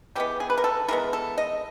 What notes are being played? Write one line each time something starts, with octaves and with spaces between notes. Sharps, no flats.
E3 G#3 B3 G4
G#4
B4
A#4
A4
E3 G#3 B3 A#4
A4
D#5